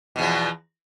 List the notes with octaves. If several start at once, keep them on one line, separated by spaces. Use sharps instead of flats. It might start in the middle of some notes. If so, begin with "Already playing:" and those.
E2 B2 F3